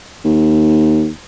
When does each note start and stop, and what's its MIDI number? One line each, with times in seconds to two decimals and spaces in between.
0.25 1.09 39